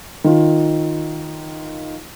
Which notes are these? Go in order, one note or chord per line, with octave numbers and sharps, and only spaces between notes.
D#3 F4